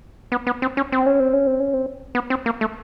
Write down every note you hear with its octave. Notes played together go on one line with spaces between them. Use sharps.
B3
B3
C4
C#4
C4
C#4
C4
C#4
C4
C#4
C4
B3
C4
A#3
A3